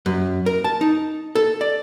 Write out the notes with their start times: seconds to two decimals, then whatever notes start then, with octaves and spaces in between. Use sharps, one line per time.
0.06 F#2
0.46 A#4
0.64 A5
0.81 D#4
1.35 A4
1.61 D5